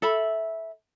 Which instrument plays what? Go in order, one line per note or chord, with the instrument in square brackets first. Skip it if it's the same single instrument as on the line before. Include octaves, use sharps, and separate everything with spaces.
[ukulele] A4 E5 B5